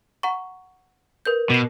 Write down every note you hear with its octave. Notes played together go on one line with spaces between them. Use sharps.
F#5 A#5 C#6
A#4 B4 G6
B2 D6 C7